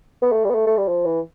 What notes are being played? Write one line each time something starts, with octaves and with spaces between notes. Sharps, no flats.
B3
A3
G3
B3
A3
A3
G3
F3
E3